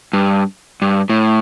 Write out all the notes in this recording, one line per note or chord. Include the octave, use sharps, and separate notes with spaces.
G2
G2
A2